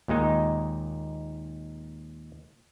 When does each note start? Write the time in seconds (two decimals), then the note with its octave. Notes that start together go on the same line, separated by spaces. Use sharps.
0.08 D#2 A#2 G#3 D#4